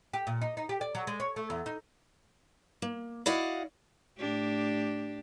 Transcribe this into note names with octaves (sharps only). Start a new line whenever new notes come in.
G4
A#2
D#4
D#4
G4
D5
F#3
G#3
C#5
A3
E2
D#4
A#3
E4 F#4 D5 D#5 F5 F#5
A2 D4 G4